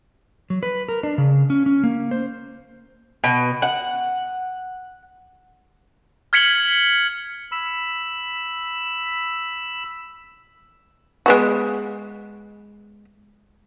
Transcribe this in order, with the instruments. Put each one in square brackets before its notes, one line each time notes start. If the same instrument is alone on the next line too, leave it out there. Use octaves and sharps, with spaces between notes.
[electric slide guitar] F#3
B4
A#4
D4
C#3
C#4
C#4
A#3
C5
[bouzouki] B2
F#5
[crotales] F6 G#6 B6 C#7 F#7 G7
[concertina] B5 E6
[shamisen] G#3 B3 F#4